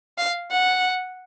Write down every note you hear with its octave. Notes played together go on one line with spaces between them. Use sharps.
F5
F#5